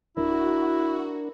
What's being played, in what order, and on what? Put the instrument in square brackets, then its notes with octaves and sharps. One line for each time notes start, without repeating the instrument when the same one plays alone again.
[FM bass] D1 [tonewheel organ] D4 A#4 [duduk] E4 [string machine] F#4